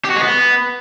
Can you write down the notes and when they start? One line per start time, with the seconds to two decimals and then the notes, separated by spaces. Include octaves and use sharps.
0.05 G4
0.10 F#4
0.16 G#3
0.22 B3